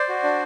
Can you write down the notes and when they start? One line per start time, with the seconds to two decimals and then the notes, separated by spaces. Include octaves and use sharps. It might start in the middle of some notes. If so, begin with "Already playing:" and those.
Already playing: C5 D5
0.09 F#4
0.23 D4